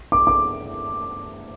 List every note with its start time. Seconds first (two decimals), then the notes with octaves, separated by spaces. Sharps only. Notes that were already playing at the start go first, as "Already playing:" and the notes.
0.12 D6
0.27 D6